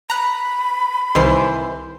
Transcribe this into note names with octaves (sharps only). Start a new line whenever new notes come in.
A#5 B5 F#6
C2 D#3 E3 C5 C7